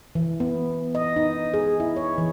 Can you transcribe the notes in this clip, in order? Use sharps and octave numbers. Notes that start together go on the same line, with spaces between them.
E3
B3
D#5
D#4
G#4
E4
C#5
E3